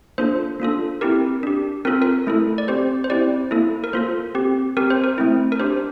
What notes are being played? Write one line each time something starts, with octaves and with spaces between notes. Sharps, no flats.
A#3 D4 F4 A4 C5
A#3 D4 F4 A4
C4 E4 G4 A#4
D4 G4
C4 F4 A4 A#4
A#4
A3 E4 A4
D5
C4 G4 C5
C5
C4 E4 G4 D5
A#3 E4 A4
A#4
A#3 F4 A4 C5
C4 G4
C4 G4 A#4
C5
A#4
A3 C4 E4
A#4
D4 G4 C5